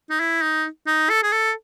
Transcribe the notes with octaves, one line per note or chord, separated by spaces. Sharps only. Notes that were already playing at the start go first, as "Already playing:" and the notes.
D#4
E4
D#4
D#4
A4
G#4
A4